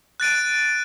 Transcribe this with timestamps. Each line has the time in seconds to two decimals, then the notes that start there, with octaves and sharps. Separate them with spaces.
0.20 F#6 A6 D7 D#7